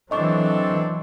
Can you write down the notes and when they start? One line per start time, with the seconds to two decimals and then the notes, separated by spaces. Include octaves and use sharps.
0.11 E3 F#3 C4 D4 A4 D#5 C#6